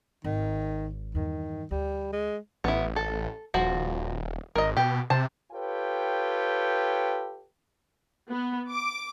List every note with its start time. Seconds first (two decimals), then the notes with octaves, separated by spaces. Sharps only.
0.24 G#1 D#3
1.15 E2 G2 D#3
1.71 D2 G3
2.12 G#3
2.64 A1 B3 E4
2.96 A4
3.54 D#1 F3 F#4
4.55 G#1 A#4 D#5
4.77 B2 G4
5.10 C3 C5 A5
5.52 F4 G4 A4 B4 C#5 G5
8.30 B3
8.69 D6